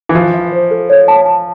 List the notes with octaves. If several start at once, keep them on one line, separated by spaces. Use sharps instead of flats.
E3
F3 E5
E5
C5
A4
C#5
A5
A5